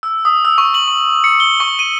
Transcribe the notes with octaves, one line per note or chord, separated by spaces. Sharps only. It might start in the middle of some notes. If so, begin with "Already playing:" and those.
E6
D#6
E6
C#6
F#7
C#6
C#7
G7
C#6
D#7